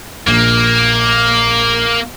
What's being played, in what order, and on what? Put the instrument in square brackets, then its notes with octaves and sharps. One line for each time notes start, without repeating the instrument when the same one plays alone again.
[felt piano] A#1 [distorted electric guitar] A#3